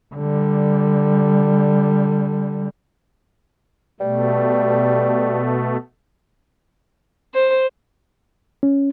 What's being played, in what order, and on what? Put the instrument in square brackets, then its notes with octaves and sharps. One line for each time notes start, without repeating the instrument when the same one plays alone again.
[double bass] D3 G3
[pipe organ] B2 A3 [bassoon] G3
[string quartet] C5
[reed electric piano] C#4